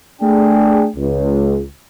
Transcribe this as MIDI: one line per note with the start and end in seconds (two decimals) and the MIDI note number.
0.22 0.88 57
0.22 0.88 62
0.22 0.88 68
0.22 0.88 79
0.97 1.65 37